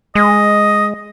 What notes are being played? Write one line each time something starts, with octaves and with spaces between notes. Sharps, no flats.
G#3 D#5